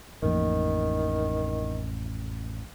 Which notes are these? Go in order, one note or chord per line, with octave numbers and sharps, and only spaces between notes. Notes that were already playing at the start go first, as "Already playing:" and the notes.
A1 F2 D#3 A#3